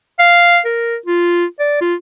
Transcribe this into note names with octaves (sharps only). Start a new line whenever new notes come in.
F5
A#4
F4
D5
F4